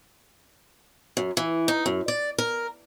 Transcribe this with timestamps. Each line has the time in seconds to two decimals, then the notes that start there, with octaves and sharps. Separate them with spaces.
1.17 F#2
1.37 E3
1.68 D#4
1.86 F#2
2.08 D5
2.38 A#4